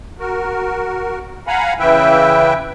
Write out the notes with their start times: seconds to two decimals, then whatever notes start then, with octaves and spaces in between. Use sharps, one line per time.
0.19 F#4 A#4
1.47 F5 F#5 G#5 A#5 B5
1.79 C#3 E3 E4 B4 E5 G5